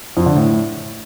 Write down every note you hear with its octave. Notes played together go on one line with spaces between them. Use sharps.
F2
D3
A2